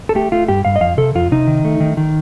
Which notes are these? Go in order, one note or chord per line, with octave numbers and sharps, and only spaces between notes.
A4
A3 G4
A3 F4
G2 G4
G2 F5
D#5
F2 F5
C3 A4
F2 F4
C3 D#4
D#3
A3
D#3
D#3